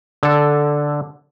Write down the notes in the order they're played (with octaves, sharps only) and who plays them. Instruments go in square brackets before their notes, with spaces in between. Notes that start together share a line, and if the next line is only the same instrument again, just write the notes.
[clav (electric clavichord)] D3 A4